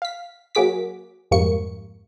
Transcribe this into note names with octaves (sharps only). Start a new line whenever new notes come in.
F5 B6
F#3 A#3 F#4 G#4 D6 B6
F2 G#2 G3 A#3 C#6 C#7